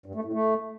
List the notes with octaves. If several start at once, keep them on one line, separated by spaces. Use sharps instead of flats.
G2
A3
A2
A3